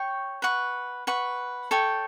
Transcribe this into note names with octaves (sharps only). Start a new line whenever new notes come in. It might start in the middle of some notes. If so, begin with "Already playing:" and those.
Already playing: C#5 G5 C#6
B4 F#5 C#6
B4 F#5 C#6
A4 C#5 G5